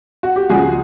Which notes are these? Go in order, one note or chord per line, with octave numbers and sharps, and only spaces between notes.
F#4
G4
C#2 C#3 F3 F#4 G#4